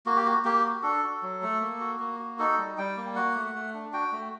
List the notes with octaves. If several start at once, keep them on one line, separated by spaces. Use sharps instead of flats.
A#3 F#4
G4
F#4
A#3 G4
F#4
D4 A4
F#4
F#3
A3
A#3
F#4
A#3
F#4
D#4 A4
G3
G3 G5
A#3
F#4 F#5
A3
A3
D4
F#4 G5
A3